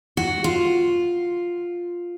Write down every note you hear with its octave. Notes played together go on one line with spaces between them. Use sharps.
F#4
F4